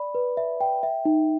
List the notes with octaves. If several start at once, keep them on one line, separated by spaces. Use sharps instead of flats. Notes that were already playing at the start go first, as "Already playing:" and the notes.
Already playing: D5 B5
B4
E5
G5
E5
D#4